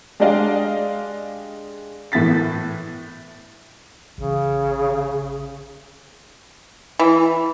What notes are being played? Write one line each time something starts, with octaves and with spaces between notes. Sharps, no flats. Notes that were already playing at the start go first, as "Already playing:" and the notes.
G#3 D4 G4 D5 D#5 F5
A2 E3 B3 A6 B6
A1 C#3
E3